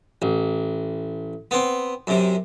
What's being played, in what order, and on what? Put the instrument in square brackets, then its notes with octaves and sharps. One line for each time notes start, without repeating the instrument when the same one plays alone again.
[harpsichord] A1
B3 C4
F#2 C3